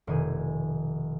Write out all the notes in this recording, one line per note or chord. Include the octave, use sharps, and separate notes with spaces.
F1 B2 D#3 G#5